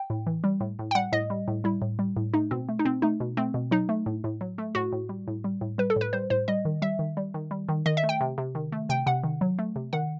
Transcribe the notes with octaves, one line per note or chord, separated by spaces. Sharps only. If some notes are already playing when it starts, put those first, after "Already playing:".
Already playing: G5
A2
E3
G3
A2
A2
G5
G3 F#5
A2 D#5
G3
A2
G3 E4
A2
G3
A2
A3 D#4
B2 C4
A3
D#4
B2 C4
A3 D#4
B2
A3 C4
B2
F#3 D#4
A3
A2
A2
F#3
A3
A2 F#4
A2
G3
A2
G3
A2
G3 B4
A4
A2 B4
G3 C5
A2 C5
G3 D#5
D#3
G3 E5
D#3
G3
D#3
G3
D#3
D#3 D#5
E5
A3
G5
C3
C3
D#3
A3
C3 G5
C3 F#5
D#3
F#3
A3
C3
D#3 F#5